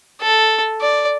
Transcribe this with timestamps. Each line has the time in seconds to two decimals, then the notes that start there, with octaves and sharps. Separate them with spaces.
0.21 A4
0.81 D5